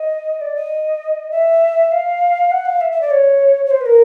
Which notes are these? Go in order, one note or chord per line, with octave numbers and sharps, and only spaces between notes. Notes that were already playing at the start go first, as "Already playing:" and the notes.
Already playing: D#5
D5
D#5
E5
F5
F#5
F5
E5
E5
D5
C#5
C#5
C5
B4
A#4